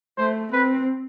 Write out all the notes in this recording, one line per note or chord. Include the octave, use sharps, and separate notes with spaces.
A3 C5
C4 B4